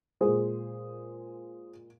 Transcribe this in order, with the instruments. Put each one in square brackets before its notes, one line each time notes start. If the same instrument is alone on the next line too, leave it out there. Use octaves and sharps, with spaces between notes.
[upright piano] A#2 G#3 G#4 C5